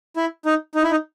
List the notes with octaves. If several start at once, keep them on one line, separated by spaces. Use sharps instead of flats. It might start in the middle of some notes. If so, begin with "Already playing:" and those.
E4
D#4
D#4
E4
D#4